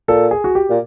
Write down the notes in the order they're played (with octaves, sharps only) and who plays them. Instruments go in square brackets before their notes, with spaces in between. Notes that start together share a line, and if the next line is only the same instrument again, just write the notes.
[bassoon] A#2 [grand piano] A4
[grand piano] G#4
F#4
G4
[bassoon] A#2